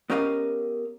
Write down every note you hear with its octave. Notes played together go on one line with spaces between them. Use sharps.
B3 C#4 G4 A#4 D#5 F5